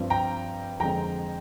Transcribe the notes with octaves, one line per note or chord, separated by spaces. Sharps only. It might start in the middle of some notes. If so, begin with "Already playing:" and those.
Already playing: G2 F3 C4
G5 A#5
F2 D3 G#3 C4 G5 A#5